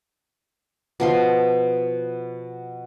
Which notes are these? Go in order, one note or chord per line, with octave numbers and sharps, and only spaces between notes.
B2 F3 C6